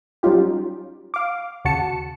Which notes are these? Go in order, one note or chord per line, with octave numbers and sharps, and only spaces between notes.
F#3 G3 C#4 D#4 F4 G4
F5 D6
D#2 C#3 F#4 A5 C#7